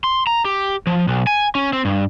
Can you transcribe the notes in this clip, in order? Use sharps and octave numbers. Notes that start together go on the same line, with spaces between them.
C6
A#5
G4
F3
B1
G#5
C#4
C4
G2